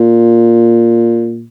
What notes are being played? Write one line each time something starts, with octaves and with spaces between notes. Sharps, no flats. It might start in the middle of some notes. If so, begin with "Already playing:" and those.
Already playing: A#2